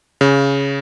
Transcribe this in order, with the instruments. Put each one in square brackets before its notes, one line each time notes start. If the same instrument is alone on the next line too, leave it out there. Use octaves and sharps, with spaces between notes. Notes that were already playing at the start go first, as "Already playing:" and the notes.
[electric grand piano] C#3